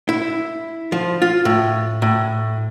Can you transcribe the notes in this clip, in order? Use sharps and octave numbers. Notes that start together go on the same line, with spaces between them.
E4
F3
F4
A2
A2